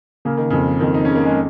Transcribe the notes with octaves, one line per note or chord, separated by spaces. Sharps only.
C#3 A#3
D#3
F2 C#3
F2 D#3
D#4
C#3 C#4
A#3
G#3